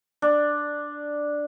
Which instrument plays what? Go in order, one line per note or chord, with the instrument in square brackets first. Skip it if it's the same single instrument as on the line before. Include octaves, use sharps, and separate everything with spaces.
[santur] D4